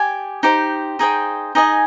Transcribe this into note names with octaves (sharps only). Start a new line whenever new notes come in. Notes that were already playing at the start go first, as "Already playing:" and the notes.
Already playing: G4 D5 G#5
D#4 G4 C5
D#4 G#4 C5 G5
D#4 G#4 D#5 G#5